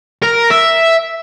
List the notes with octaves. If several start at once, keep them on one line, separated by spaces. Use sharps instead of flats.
A#4
E5